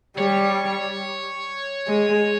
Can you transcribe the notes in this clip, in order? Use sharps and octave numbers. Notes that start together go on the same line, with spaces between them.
G3 C#5
G#3